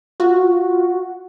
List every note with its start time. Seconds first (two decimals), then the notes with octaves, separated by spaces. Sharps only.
0.20 F4 F#4